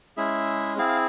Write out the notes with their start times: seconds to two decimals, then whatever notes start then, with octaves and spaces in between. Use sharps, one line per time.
0.17 G#3 C#4 E4 G#4 E5
0.78 C4 E4 G#4 F5
0.88 F5